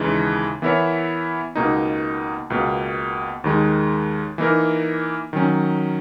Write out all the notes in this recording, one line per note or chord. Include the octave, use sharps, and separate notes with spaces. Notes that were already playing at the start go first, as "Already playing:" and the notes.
Already playing: D#2 C#3 E3 G#3 D#4
E3 B3 E4 A#4 C#5
C#2 B2 A#3 D#4
C#2 B2 A#3
D#2 D#3 G#3
E3 A#3 D#4 A#4
D#3 F#3 C#4